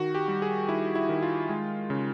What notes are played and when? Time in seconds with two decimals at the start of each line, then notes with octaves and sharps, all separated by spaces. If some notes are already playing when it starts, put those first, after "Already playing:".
Already playing: D#3 F#4
0.15 G4
0.28 G3
0.42 G#4
0.69 D#3 E4
0.95 E4
1.09 D#3
1.23 F4
1.49 G#3
1.90 C#3